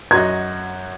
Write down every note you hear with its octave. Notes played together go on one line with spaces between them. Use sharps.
F#2 F#4 D#5 A#5 C6 G#6